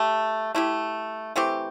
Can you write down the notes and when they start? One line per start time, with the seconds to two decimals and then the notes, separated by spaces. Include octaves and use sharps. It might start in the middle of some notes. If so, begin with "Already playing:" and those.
Already playing: A3 G4
0.55 A3 E4 G4
1.36 E3 A3 C4 G4